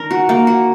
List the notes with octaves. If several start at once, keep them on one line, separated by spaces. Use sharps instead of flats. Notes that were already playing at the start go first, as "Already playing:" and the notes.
Already playing: D#3 D4 A#4
F#4
A#3
F#4